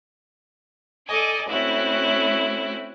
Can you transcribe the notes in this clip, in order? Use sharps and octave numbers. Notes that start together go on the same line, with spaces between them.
A4 D5 D#5 G#5
A3 C4 C#4 E4 F#4